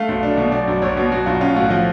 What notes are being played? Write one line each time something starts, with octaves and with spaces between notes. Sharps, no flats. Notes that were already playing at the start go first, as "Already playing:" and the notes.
Already playing: A3 F5
B1
D4
B2
F#3 D5
B1
B1 C#5
B2
F#3 F#4
B1 F4
C#4 F4
A2 F#4
F3